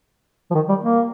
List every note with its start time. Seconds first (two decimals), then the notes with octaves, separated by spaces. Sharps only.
0.51 F3
0.54 D#3
0.69 G3
0.83 A#3